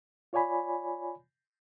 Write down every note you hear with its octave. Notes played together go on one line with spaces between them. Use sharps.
F4 C#5 D5 G#5 B5